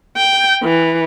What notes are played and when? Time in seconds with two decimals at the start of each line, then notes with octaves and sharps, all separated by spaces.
0.17 G5
0.63 E3